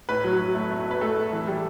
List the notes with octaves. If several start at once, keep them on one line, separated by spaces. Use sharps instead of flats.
A2 B4
F#3
F#3
A3
A3
A3 B4
A3 A4
A3
E3
G3